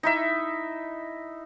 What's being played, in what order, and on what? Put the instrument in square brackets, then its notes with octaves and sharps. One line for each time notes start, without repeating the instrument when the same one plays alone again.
[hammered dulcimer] D#4 E4 E5